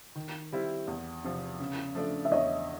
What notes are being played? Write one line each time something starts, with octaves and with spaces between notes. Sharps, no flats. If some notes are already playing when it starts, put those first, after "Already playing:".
D#3
G3 C4 E4
E2
C3 F3
C#3
F3 A3 D4
E5
E2 C#5 D#5